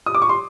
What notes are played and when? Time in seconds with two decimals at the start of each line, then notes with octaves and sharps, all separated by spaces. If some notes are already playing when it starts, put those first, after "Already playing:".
0.06 D#6
0.15 D6
0.22 C#6
0.29 C6